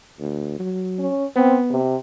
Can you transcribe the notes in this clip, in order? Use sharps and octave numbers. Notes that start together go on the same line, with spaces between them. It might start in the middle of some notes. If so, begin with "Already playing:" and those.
D2
F#3
C#4
B3 C4
C3